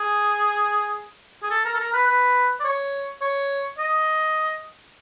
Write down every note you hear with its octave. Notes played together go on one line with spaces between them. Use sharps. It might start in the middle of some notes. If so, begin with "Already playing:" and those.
Already playing: G#4
G#4
A4
A#4
A4
A#4
B4
B4
D5
C#5
C#5
D#5